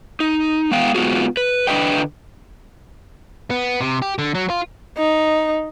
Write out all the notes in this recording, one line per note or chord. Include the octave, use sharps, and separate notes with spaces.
D#4
G#3 B3 F5 G5
G#3 B3 C4 F4 F#4 G#4
B4
D3 D4 F#4 B4 D#5 G5
B3
C3
G4
D3
F#3
F4
D#4